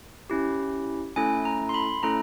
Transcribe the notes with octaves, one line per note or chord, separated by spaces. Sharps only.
C#4 E4 G4
A3 C#4 E4 A4 G#5
A#5
C6
B5
A3 C#4 E4 A4 A#5